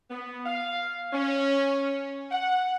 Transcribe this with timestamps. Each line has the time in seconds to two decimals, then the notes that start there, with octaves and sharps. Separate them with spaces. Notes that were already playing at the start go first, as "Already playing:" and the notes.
0.11 B3
0.45 F5
1.13 C#4
2.32 F#5